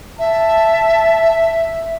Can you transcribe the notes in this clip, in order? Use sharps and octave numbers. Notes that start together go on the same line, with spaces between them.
E5 A5